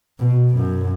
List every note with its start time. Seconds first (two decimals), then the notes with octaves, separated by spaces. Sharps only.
0.19 B2
0.56 F#2